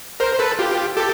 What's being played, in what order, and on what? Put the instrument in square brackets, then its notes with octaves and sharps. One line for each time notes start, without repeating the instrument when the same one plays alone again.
[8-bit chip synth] A#4 C5
C5
A4 B4
F4 G4
G4 A4